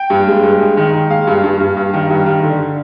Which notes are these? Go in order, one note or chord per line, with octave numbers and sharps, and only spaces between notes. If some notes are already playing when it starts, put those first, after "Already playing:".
Already playing: G5
G2
G#3
G2
G#3
D#3
D#3
G#3 F5
G2
G2
G2
G2
D#3
G2
D#3
D3